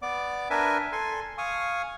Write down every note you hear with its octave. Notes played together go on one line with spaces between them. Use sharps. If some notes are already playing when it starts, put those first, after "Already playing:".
B3 D5 D6
D4 A#4 B4 E5 G#5
A4 G#5 C6
F5 G#5 C#6 D#6